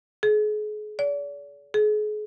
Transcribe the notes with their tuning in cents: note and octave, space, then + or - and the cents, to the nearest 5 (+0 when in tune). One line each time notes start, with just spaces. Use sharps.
G#4 +35
D5 -40
G#4 +35